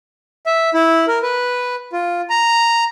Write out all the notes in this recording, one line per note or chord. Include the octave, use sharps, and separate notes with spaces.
E5
E4
A#4
B4
F4
A#5